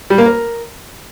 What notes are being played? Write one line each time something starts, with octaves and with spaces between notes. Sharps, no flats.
G3
A#3
A#4